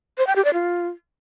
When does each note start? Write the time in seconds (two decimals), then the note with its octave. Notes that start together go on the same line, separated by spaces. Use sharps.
0.18 C5
0.27 G5
0.36 G4
0.45 D5
0.54 F4